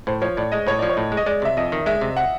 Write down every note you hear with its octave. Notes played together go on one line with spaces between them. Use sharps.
A2 C5
F3 C#5
A2 D5
G#3 D#5
A2 C#5
F3 D5
C#5
A2
G#3
D#5
G#3 D5
C3 E5
F2 D#5
D#3
G#3 E5
C3
F#5